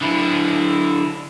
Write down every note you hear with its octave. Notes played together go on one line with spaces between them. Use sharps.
D3 E4